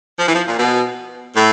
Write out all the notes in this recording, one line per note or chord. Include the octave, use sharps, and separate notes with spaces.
F3
E3
F3
A#2
B2
A2